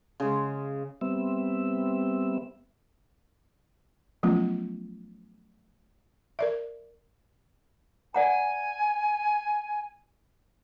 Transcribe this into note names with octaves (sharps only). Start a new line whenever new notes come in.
C#3 G#3
G3 B3 C4 E5
F3 F#3 A3 B3 C#4 F4
A#4 D5 E5
D5 F#5 G#5 A#5